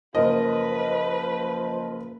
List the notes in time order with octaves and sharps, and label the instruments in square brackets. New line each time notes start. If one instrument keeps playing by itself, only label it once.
[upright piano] F#1 A#4 D#5 [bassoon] F3 [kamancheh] B4